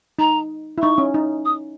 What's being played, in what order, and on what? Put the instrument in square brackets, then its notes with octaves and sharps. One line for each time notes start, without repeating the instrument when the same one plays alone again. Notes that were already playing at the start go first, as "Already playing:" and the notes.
[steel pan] D#4 [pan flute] A#5
[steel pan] E4
[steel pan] D#4 [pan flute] C#6
[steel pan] C#4
D#4
[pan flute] D#6